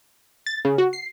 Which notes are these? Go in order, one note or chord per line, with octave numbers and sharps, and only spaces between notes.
A6
C#3
F#4
C7